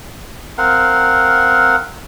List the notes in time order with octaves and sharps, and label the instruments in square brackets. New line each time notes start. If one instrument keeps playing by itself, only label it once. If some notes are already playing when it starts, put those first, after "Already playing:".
[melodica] C4 A#4 F5 F#5